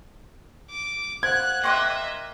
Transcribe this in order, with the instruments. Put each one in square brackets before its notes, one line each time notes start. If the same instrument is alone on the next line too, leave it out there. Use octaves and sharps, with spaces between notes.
[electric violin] D6
[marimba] C5 F5 F#5 [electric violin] F#6 [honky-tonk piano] G#6
[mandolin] A#3 C#6 F#6 [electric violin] D#5 E5 [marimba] G5 C6